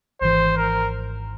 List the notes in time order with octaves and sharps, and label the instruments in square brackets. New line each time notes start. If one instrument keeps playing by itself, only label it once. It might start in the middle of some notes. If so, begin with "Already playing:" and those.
[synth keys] G#1 G#2 E3 [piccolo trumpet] C5
[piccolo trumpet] A#4